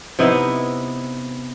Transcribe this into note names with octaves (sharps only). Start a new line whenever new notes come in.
C3 B3 D#4 E4